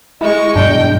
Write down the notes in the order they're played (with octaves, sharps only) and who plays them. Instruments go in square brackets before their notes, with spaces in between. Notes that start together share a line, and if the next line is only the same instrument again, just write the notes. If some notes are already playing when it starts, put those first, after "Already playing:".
[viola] G#3 C#6 [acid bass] E4 [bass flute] D#5
[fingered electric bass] G2 B2 F#3 [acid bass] D4 [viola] G5